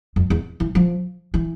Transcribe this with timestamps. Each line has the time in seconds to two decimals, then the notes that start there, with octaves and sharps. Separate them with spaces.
0.16 F2
0.30 E2
0.60 E3
0.75 F3
1.34 E3